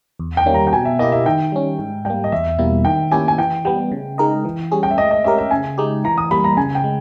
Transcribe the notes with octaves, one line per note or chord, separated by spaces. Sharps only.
E2
G5
D#3 G3 A#3 C#4
A#5
G5
B2 G#5
E5
A#3 E4 G4 D#5
E5
D#3 G5
G3 C#4
G#2
G3 A#3 G5
D#5
E2 E5
B2 G3 A#3 E4
D#3 G5
A#3 C#4 E4 G4 G#5
G#5
E3 G5
G3 B3 G5
C#3
G#3 D#4 A#4 D#5
E3
G3 C#4 G#4
G5
E5
G#3 D#5
D#5
C#4 G4 A#4 E5
E5
C#3 G#5
G#3 D#4 G4
E3 A#5
D#6
G3 A#3 B5
A#5
C#3 G#5
G5
G#3